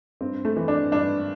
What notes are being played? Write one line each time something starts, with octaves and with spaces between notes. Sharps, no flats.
G2 C4
A3
E3
D4
G2 D4